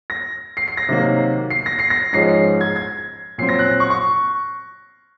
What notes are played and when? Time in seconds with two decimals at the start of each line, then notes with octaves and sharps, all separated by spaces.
0.10 A#6
0.57 C7
0.68 C7
0.77 A#6
0.89 C3 D#3 F#3 A#3
1.50 C7
1.66 A#6
1.79 C7
1.90 A#6
2.13 G#2 F3 G#3 C#4 C7
2.29 C7
2.61 G#6
2.76 G#6
3.38 A#2 F#3 C4 C7
3.49 A#6
3.59 F#6
3.80 C#6
3.90 C#6